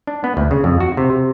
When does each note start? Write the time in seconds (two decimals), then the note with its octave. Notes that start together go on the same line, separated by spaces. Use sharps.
0.07 D4
0.24 B3
0.37 D2
0.51 C#3
0.64 F2
0.80 F#4
0.97 C3
1.10 C3